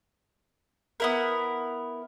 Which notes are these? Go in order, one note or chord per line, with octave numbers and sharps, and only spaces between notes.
B3 E4 A#4